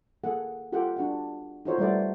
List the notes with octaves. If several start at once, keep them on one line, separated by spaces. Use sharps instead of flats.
A#3 G#4 A4 F#5
F4 G4 A4 F#5 G5
D4 F#4 F#5
D#4 F4 F#4 A4 C5 C#5
G3 A3 A4 B4 D5 F#5